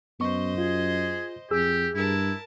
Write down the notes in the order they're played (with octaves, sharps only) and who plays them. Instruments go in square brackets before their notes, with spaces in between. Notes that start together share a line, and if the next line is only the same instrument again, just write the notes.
[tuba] F#2 [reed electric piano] B3 C#6 [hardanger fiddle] C5 D#5
[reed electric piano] F4 [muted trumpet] G#4
[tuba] F2 [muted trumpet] G4 [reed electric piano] G#4 E6
[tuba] G2 [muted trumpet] E4 [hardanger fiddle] A#4 A5